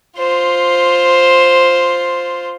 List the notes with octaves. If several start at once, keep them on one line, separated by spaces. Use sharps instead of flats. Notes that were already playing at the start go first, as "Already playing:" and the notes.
F4 C5